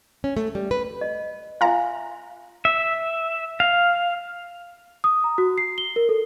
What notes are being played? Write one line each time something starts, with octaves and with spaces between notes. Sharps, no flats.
C#4
A3
G3
B4
D#5
F4 E5 F5 G#5 A#5
E5
F5
D#6
A#5
F#4
C7
G7
A#4
A4